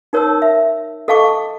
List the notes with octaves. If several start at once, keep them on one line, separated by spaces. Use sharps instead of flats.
D#4 A#4 C#5 A5 E6
E5
A4 D#5 F5 A5 C#6 D6